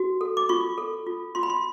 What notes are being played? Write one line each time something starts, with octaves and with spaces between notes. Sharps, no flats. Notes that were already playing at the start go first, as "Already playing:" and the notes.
Already playing: F#4
A4
D6
F4 C#6
A4
F4
F4 C6
B5
C6